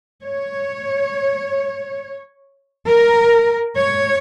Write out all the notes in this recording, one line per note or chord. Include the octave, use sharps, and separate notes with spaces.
C#5
A#4
C#5